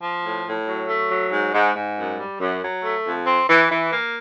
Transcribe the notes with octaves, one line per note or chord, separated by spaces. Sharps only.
F3
A2
A2
F#3
A3
F#3
G#2
G#2
G#2
F#2
G3
F#2
F#3
A3
F2
C4
E3
E3
A#3